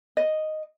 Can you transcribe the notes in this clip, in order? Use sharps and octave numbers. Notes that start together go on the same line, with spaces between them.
D#5